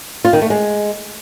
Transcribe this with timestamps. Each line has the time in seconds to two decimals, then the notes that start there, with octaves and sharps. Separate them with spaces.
0.25 F4
0.33 D#3
0.42 A3
0.50 G#3